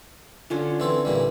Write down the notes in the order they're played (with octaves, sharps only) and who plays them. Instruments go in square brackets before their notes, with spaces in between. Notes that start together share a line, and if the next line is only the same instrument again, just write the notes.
[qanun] D3 C#4 F4
[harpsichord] E3 C4 A4
A#2 E3 G3